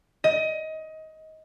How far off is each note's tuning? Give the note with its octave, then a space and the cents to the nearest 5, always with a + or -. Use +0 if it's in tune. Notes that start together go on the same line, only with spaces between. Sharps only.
D#5 +20